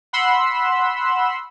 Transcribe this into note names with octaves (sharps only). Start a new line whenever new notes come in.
F#5 B5 C6 E6